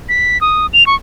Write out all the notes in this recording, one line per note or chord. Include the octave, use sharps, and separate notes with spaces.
B6
D#6
F7
C#6